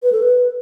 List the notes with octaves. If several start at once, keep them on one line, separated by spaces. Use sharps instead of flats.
B4
A4
B4